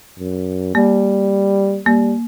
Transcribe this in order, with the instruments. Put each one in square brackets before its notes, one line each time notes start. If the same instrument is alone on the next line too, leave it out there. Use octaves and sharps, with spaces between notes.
[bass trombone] F#2
[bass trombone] G3 [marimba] A#3
[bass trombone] G3 [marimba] A#3